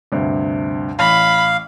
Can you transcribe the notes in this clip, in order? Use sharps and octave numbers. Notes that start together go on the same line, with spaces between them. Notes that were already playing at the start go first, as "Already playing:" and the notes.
D2 G2 C3
A1 F5 B5